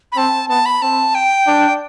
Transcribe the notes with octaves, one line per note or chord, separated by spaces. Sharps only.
B5
C4 A5
B3 A5
B5
C4 A5
G5
D4